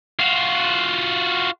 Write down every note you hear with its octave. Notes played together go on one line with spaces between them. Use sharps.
F4 F#4